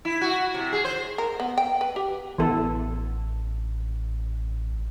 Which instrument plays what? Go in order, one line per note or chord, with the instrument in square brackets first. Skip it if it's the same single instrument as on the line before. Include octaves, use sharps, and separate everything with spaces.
[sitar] E4
F#4
C3
G#4
C5
[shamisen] A#4
B3
G5
B4
G4
[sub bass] A1 [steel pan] E3 B3 A4